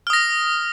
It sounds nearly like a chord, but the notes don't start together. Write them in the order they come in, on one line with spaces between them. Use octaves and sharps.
F6 D#6 A#6